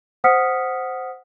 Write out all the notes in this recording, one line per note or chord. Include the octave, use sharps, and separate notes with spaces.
C5 F#5 D#6 F6 B6 C#7